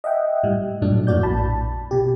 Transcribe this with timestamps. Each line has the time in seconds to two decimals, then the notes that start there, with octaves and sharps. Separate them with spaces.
0.04 D#5 E5 F#5 G5
0.44 A2 G3
0.82 G2 A#2 F#3 A3 D4
1.07 F2 A2 A#3 F#4 D5 G6
1.23 A#1 A5 B5
1.91 B2 G4